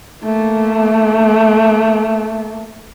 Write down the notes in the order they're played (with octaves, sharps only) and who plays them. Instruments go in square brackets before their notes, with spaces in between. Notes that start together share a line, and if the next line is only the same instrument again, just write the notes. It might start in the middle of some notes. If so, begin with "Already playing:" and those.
[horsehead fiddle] A3 A#3